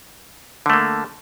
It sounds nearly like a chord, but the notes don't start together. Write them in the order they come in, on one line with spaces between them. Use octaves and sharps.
D3 A3 A#3